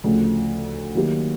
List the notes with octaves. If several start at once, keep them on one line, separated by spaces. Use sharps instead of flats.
D2 C#3 F3 A3
D#3 F#3 A#3 D#4 G4